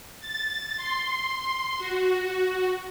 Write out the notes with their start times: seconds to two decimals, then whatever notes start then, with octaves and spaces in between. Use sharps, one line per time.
0.20 A6
0.77 C6
1.78 F#4